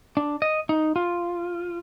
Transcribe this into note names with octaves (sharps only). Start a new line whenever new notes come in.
D4
D#5
D#4
F4